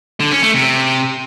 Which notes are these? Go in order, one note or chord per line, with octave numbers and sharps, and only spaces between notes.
D3
C#4
A3
C3